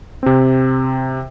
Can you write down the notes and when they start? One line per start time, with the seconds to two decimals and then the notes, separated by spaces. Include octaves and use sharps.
0.23 C3 C4